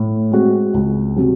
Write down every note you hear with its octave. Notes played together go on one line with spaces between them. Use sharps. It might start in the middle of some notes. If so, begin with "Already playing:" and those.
Already playing: A2
G#3 C4 F#4
C#2
C3 F#3